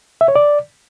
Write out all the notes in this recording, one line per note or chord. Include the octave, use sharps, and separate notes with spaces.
E5
C#5
D5